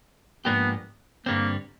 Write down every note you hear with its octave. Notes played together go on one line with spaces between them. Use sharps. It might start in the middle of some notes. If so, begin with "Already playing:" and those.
G#2 F3 A#3 B3 D4 G4
G2 D3 G3 A#3 C4